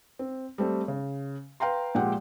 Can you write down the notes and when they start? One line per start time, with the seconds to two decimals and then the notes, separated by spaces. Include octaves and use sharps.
0.19 C4
0.58 G3 A3 C4
0.88 C#3
1.60 B4 F5 G5 A#5 C6
1.95 A#2 F3 G#3 G4 F#5 G5